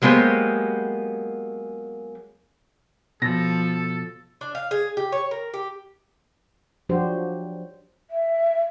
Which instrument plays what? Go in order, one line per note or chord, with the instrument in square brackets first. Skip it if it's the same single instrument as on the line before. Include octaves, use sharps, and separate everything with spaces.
[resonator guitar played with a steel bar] F#3 G#3 A#3 B3 G4 C5
[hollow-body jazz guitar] B2 [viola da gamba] F3 [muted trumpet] A4 [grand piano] A#6
[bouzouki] D4
F5
G#4
G4
C#5
A#4
G4
[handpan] F3 F#3 D4 F#4 G4 C5
[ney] E5